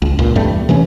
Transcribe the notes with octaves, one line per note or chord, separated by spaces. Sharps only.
C#2
C#2 A#2
E2 G2 G3 A3
C3 E3 A3 C#4